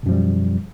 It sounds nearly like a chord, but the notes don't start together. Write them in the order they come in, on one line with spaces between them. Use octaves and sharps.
B2 F#2 F3 G3